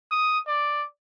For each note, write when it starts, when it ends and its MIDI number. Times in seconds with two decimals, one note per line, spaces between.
0.11 0.40 87
0.48 0.85 74